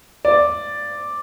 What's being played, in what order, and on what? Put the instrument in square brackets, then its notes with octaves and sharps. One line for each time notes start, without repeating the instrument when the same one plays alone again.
[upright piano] D5